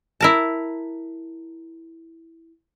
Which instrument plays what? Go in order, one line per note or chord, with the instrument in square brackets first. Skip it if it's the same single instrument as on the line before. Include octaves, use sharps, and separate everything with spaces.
[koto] E4 A#4 A5